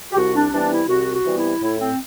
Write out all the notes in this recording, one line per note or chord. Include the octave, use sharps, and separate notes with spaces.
G4
C2 F#4
D4
C3 E3 G3 B3 D4
E4
C2 F#4
F#4
C3 E3 G3 B3
E4
A2 E4
C4